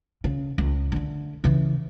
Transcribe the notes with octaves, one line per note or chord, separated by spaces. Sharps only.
C#3
C#2
D3 A3
C#3 E3